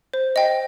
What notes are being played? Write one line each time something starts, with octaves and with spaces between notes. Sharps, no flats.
C5
D#5 G5